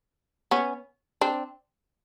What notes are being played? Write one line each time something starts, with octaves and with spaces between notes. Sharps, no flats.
B3 C#4
C4 D4